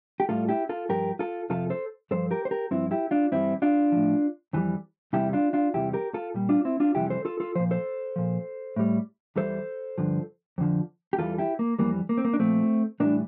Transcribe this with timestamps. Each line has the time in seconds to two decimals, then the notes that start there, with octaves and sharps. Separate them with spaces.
0.20 G4
0.29 A2 G3 F4 A4
0.49 E4 G4
0.69 F4 A4
0.89 G2 F3 G4 A#4
1.19 F4 A4
1.50 F2 C3 F3 F4 A4
1.70 A4 C5
2.11 G2 F3 A4 C5
2.31 G4 A#4
2.45 C5
2.51 G4 A#4
2.71 G2 F3 C4 E4
2.91 E4 G4
3.11 D4 F4
3.31 G2 E3 G3 C4 E4
3.62 D4 F4
3.92 A2 F3
4.53 F2 E3 G3
5.13 E2 C3 G3 E4 G4
5.33 D4 F4
5.53 D4 F4
5.74 E2 C3 G3 E4 G4
5.93 G4 A#4
6.14 F4 A4
6.34 A#2 G3
6.49 D4 F4
6.65 C4 E4
6.80 D4 F4
6.94 F2 C3 E3 G3 E4 G4
7.10 A4 C5
7.25 F4 A4
7.40 F4 A4
7.55 F3 C5
7.59 A#2
7.71 A4 C5
8.16 A#2 F3
8.76 A2 G3
9.36 E2 E3 G3 A4 C5
9.98 G2 D3 F3
10.58 F2 D3 F3
11.13 G4
11.18 E2 E3 G3 F4 A4
11.38 E4 G4
11.59 A#3
11.79 F2 E3 G3 A#3
12.09 A#3
12.18 C4
12.25 A#3
12.33 D4
12.39 A#2 F3 A3 C4
13.00 A2 E3 G3 A#3 D4